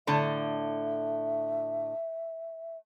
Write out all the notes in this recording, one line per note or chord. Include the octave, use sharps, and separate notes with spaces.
A2 D3 E5 A5